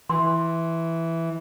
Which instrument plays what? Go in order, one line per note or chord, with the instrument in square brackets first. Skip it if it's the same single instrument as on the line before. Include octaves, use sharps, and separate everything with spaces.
[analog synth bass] E3 [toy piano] C6